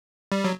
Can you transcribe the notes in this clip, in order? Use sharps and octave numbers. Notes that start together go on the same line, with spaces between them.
G3
F#3